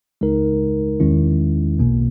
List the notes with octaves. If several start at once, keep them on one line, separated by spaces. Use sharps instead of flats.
C#2 C#3 G#3 D#4 A#4
E2 D#3 G#3 C#4 E4
B1 B2 A#3